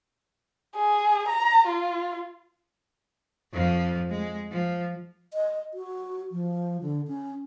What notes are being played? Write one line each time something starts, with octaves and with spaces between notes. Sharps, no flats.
G#4
A#5
F4
F2 F3
G#3
F3
D#5
F#4
F3
D3
C#4